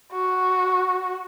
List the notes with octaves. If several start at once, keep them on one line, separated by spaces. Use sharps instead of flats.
F#4